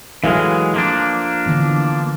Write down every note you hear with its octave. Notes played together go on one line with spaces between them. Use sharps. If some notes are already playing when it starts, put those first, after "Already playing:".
E3 F#3 G#3 A4 F5
F3 A#3 D4
D3 E3 B3